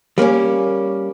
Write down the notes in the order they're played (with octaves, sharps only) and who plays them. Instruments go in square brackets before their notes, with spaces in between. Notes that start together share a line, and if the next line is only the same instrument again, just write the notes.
[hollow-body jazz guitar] G3 A#3 C4 C#4